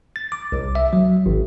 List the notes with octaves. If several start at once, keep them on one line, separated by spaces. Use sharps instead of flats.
A6
D6
C2
E5
F#3
G#1